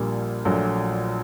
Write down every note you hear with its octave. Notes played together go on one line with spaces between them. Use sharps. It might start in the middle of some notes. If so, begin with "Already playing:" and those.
Already playing: A#1 A#2 G3 A#3
A#1 A#2 F#3 A3